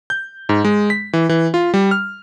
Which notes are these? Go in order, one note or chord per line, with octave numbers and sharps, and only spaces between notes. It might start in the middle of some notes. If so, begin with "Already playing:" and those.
G6
G#2
G#3
B6
E3
E3
F4
G3
F6